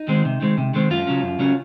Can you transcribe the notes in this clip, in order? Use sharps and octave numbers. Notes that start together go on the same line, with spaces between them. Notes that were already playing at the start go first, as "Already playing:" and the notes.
Already playing: D#4
D#3 G#3 C4
C3
D#3 G#3 C4
C3
D#3 G#3 C4
F#2 F4
C#3 F#3 C#4
F#2
C#3 F#3 C#4